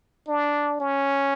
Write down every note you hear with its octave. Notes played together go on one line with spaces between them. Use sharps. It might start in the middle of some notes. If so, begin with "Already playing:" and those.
D4
C#4